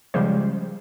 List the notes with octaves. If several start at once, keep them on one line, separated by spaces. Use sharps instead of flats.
C#3 F3 G3 G#3 C5